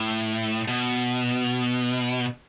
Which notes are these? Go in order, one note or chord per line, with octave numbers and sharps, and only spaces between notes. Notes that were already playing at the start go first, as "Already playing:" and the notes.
Already playing: A2
B2